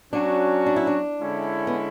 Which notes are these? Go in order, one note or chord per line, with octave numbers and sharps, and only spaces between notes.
F#3 C#4 D4 F#4
D4
E4
D4
D3 G#3 C#4 E4
B3